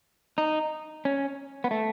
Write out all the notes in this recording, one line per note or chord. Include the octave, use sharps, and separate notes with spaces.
D#4
C#4
B3
A3